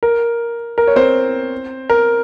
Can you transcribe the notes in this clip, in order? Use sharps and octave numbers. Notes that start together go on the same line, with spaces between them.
A#4
A#4
C#5
C4 C5
A#4